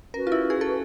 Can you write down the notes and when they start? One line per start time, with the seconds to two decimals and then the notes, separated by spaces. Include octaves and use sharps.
0.14 C#4 F#4 A#4 B4
0.27 F4
0.32 E4
0.50 G#4
0.61 A4